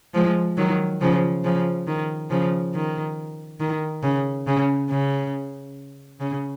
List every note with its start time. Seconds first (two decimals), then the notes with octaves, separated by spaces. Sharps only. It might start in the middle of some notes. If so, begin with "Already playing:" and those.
0.14 F3 G#3
0.57 D#3 F#3
1.01 C#3 F3
1.44 C#3 F3
1.87 D#3
2.30 C#3 F3
2.74 D#3
3.60 D#3
4.03 C#3
4.47 C#3
4.90 C#3
6.20 C#3